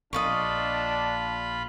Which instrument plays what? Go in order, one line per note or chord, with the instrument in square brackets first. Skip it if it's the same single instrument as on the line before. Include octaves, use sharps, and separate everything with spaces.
[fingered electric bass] A#1 [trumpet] D4 [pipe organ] F4 B5 [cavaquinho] D#5 F5 C#6